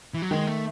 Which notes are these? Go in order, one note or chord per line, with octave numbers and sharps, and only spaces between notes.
E3
F#3
D#3 G#3
A3